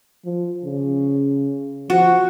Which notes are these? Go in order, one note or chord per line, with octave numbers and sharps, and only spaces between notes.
F3
C#3
F3 F#4